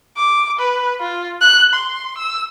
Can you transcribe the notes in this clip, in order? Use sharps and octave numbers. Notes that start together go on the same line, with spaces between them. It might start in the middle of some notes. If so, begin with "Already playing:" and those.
D6
B4
F4
F#6
C6
E6